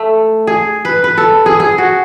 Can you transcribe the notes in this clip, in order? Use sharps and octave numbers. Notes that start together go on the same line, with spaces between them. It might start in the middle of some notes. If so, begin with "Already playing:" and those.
Already playing: A3
G#4
B4
B4
A4
G#4
G#4
F#4